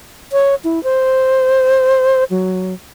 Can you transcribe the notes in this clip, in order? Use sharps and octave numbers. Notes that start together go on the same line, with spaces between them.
C#5
E4
C5
F#3